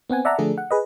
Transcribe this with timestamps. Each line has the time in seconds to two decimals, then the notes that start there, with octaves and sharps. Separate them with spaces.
0.10 B3 C4 F#5 G#5
0.25 D5 E5 F#5 A5 A#5
0.38 D3 F3 A3 D4 G#4 A4
0.58 F#5
0.71 G#4 B4 D#5